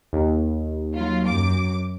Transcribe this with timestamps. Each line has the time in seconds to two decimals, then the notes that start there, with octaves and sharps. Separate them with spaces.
0.13 D#2
0.95 F#3 F4
1.28 F#2 D6